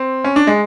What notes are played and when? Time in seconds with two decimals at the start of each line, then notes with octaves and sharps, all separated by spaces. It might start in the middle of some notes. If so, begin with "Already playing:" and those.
Already playing: C4
0.24 C#4
0.36 D4
0.47 G#3